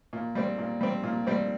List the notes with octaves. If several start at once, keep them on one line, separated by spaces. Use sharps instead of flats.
A#2
G3 C4
A#2
G3 C4
A#2
G3 C4